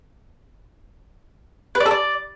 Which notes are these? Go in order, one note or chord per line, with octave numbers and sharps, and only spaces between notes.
B4
D5
A4
D5